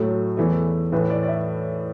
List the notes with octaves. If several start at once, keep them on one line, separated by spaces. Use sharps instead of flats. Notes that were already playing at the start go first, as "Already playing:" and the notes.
Already playing: A2 F#3 A3
E2 E3 A3
A2 E3 A3 B4
D5
D5
E5